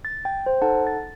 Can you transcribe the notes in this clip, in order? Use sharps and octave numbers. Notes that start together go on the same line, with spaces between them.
A6
G5
C5
D#4 A4 F#5 A5
A6